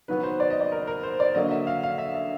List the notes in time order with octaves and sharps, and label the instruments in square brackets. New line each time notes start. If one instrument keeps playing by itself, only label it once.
[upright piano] D#3 F#3 B3 B4
C5
D5
D#5
D5
A#4
A#4
C5
D5
D3 F#3 A#3 D#5
E5
F5
F5
E5
E5